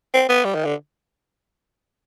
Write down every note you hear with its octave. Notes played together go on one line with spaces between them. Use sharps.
C4
B3
G3
D#3
D3